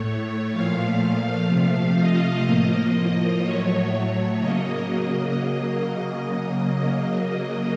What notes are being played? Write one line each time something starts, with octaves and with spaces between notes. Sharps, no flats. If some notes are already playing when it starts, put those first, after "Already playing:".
Already playing: A2 A3 C#5
A#2 F3 A3 F5
C3 F3 A3 F5
D#5
A2 F3 A#3
A2 F#3 A3 C#5
C#3 F#3 A#3 D#5